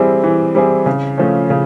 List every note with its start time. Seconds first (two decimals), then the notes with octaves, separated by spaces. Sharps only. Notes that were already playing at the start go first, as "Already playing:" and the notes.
Already playing: E3 G3 C4 E4 G#4
0.24 E3
0.55 G3 C4 E4 G#4
0.86 C#3
1.18 F3 A3 C#4
1.50 C#3